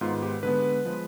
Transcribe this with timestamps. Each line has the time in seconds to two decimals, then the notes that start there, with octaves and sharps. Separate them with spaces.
0.01 G#2 D#3 B3 F4
0.22 G4
0.43 D3 G#3 B3 B4
0.85 F3 G#3